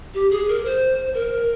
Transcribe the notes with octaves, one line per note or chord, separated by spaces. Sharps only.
G4
G#4
A#4
C5
A#4